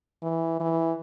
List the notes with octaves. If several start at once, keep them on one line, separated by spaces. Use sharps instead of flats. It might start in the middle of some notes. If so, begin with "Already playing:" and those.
E3
E3